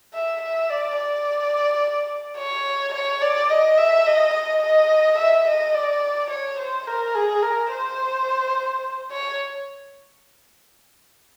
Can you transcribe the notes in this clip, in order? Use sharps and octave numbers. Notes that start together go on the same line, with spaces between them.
E5
E5
D5
D5
C#5
C#5
D5
D#5
E5
D#5
D#5
D#5
E5
D#5
D5
C#5
C5
A#4
G#4
A#4
C5
C#5